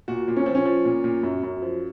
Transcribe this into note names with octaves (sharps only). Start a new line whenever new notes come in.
A#2 F#4
A#2
C#4
F3 C4
C#4
F3
A#2
A#2
F#2
F#2
F3